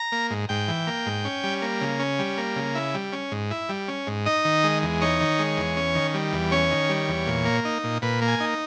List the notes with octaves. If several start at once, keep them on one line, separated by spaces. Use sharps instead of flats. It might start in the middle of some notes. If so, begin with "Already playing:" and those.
Already playing: A#5
A#3
G#2
G#2 G5
E3
A#3
G#2
C#4
G3
A#3
C#3
C#4
G3
A#3
C#3
E4
G3
C#4
G#2
E4
G3
C#4
G#2
D#4 D#5
D#3
G#3
E2
D#4 C#5
D#3
G#3
E2
C#4
D#3
G3
E2
C#4 C#5
D#3
G3
E2
A#2
A#3
D#4
A#2
A#2 B4
A#3
G#5
D#4